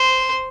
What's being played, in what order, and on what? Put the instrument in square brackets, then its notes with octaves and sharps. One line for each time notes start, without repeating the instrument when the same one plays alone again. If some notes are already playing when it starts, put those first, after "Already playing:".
Already playing: [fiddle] C5